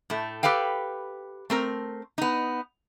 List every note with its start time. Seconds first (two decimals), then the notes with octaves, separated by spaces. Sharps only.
0.10 A2 A3
0.43 G4 A4 B4 F5 G5
1.50 A3 C4 A#4
2.18 B3 D#4